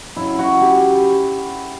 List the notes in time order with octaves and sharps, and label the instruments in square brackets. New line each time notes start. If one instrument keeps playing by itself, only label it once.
[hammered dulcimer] C#3 F#3 E4
F#4
G4